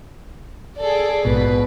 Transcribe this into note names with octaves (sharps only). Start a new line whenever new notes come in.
G#4 A4 D5
A#1 G#2 B2 B4